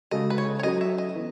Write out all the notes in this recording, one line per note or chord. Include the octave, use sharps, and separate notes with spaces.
C#3 G#3 C#4 F#4 A4 D#5
B4
C#5
C#5
F#3 C#4 F#4 A4 D#5
E5
D#5
E3 B3